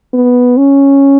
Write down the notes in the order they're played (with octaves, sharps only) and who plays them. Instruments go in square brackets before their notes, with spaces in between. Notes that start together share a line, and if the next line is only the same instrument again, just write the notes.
[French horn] B3
C#4